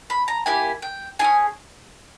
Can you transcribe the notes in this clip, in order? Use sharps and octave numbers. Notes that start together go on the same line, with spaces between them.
B5
A#5
A#3 E4 G4 G#5
G5
C#4 E4 G#4 G#5